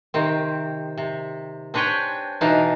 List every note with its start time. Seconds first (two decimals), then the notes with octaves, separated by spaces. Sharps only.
0.14 C3 D#3 C4
0.98 C3
1.74 C4 D4 B4 C#5 G5 G#5
2.41 B2 E3 D4 D#4 F5